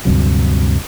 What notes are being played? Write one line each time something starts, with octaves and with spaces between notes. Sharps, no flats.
D2 G2 C3 F#3